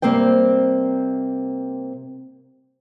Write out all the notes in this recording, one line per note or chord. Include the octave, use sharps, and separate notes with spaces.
C3 G3 A#3 C4 C5 G5